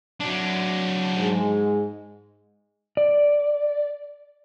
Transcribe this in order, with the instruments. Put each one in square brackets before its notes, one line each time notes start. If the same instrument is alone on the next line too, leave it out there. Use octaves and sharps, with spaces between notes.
[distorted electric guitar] F#3 D4
[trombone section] G#2 G#3
[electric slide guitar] D5